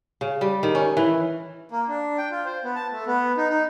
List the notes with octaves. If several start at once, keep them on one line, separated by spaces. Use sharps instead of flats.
C#3
G3
D#3
C#4
E3
A#3
D4
G5
F4
C5
B3
A5
A3
B3
D#4
D#4